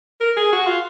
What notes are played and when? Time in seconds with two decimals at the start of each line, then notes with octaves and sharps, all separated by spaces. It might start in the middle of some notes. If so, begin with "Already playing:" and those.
0.20 A#4
0.37 G#4
0.53 F#4
0.67 F4